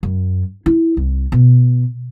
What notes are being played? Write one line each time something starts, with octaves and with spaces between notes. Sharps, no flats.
F#2
E4
C2
B2